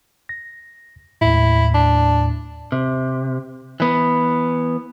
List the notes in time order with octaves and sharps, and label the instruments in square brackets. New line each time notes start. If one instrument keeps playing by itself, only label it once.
[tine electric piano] A#6
[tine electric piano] D#2 A2 [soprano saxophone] E4
[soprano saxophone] D4
[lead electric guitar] C3
E3 B3